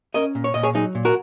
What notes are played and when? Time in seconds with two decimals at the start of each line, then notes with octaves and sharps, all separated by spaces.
0.14 C#4 A#4 D#5
0.35 A#2
0.44 C#5
0.54 A#2 D#5
0.63 G#4 C#5
0.74 F#3 D#4 G#4
0.95 A#2
1.05 F#4 A#4